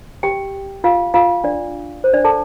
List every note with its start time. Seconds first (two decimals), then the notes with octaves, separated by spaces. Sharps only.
0.23 G4 G5
0.84 F4 F5
1.14 F4 F5
1.44 D4 D5
2.04 C5
2.14 D4 D5
2.24 A4 A5